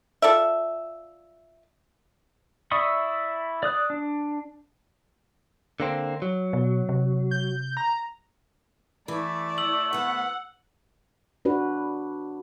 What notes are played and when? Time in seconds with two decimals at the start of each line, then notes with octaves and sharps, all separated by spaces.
0.22 F4 A4 D5 E5
2.71 E4 D5 E5 C#6 D#6
3.63 D5 D#6 F#6
3.90 D4
5.80 D3 A#3 C4
6.22 F#3
6.53 B2
6.89 C3
7.31 G6
7.77 A#5
9.08 E3 A3 D5
9.58 E6 F#7
9.93 D2 B3 F#5
11.45 D4 F#4 B4